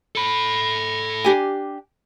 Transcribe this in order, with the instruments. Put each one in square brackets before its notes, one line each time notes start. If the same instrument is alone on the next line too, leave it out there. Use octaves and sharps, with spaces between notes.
[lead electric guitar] A4 B5
[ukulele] D4 G4 G#5